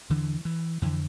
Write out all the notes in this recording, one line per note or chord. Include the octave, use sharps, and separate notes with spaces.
E2 D3 E3
E3
F2 D3 E3